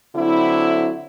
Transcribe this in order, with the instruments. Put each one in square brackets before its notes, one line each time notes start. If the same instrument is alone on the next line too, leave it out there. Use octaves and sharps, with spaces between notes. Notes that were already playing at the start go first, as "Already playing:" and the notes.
[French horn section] D3 F#3 C4 E4